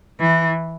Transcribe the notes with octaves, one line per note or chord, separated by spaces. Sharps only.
E3